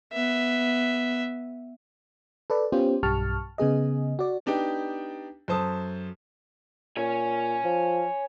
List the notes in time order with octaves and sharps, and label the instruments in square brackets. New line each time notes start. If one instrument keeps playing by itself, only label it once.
[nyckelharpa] B3 E5
[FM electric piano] A4 B4 D5
B3 C#4 F4 G4 C5
B1 G2 G4 A5 C#6 F6
C#3 B3 G#4 D#5
F#4 D5
[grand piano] B3 D4 D#4 G4 G5
F#2 A4 C5 A5 D#6
[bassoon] A#2 [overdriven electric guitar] C#5 G#5
[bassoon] F3